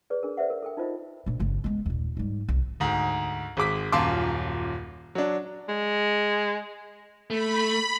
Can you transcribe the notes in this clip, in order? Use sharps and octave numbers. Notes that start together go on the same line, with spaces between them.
G#4 B4 C#5 D5
D4 G#4 A#4
B4 C5 D5 E5 F#5
A#4
A4 A#4 G5
D#4 F4 C5 D#5 B5
A#2 D4
G1 C#3
G#3 B3
D#2 A#2
G#2 G3
C2
D2 G#2
G#1 G#3 D6 B6
D#1 F#2 F4 A5 C6 D6
F#3 D4
G#3
A3 B5